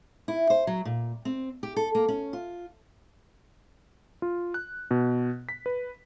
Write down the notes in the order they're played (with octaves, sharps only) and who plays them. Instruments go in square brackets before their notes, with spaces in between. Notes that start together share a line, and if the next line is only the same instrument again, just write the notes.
[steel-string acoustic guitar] E4
C5
F#3
A#2
C4
G4
A4
A#3
C#4
F4
[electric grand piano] F4
F#6
B2
B6
B4